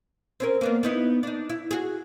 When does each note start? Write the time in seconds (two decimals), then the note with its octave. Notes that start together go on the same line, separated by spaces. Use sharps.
0.40 C4 C#4 A#4
0.61 A#3 B3 D4
0.83 B3 D#4 E4
1.23 D4 D#4
1.50 E4
1.71 F#4 G#4